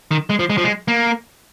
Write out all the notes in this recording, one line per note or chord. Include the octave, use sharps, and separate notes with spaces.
D#3
G#3
F3
G#3
F3
G#3
A#3